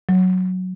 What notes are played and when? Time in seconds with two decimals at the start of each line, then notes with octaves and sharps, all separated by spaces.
0.09 F#3